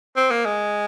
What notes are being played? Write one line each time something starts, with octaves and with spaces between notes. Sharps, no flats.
C4
A#3
G#3